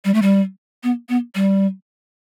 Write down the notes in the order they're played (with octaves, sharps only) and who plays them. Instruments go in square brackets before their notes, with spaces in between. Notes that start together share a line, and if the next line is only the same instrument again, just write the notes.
[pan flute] G3
A3
G3
B3
B3
G3